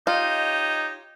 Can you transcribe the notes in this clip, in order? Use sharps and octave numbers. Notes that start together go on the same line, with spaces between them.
D#4 F4 G4 C#5 D#5